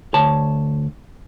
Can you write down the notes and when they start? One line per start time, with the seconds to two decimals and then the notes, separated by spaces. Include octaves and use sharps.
0.14 D2 C#5 A5